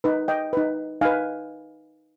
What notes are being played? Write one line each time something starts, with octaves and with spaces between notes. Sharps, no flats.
D#4 B4
D#5 G5
D#4 B4
D#4 B4 F5 G#5